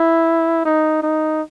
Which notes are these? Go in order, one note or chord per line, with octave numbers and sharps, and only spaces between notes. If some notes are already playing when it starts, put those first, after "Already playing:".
Already playing: E4
D#4
D#4